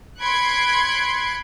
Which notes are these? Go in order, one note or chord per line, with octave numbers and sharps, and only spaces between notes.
B5 C6 F#6 G#6 C#7 D7